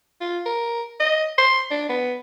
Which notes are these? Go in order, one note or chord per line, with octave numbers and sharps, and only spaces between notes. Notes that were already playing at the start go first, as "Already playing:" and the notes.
F4
A#4
D#5
C6
D4
B3